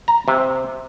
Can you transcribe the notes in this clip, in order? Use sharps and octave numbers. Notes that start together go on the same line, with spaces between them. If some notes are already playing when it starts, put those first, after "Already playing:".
A#5
C3